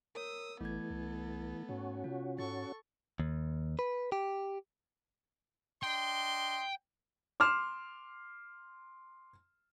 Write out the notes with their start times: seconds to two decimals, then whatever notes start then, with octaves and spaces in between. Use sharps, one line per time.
0.15 A#4 C#5 D#6 E6
0.61 A1 E3 A3 B3 A4 G#6
0.91 C2
1.69 G#2 C#4 F#4
2.04 C3 F4
2.39 G#2 A4 C#6 A6
3.20 D#2
3.79 B4
4.12 G4
5.83 D4 D#5 G5 C6
7.40 C6 D6 F6 E7